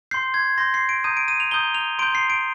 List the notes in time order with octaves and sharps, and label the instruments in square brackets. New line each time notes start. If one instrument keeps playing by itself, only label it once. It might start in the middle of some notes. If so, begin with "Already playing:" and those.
[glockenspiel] C6 G6 C7
G#6
C6 G6 A#6
C7
D7
A#5 D#6 G6 D#7
D7
D#7
F7
A#5 D#6 G6 G7
F7
C6 G6 D7
C7
D7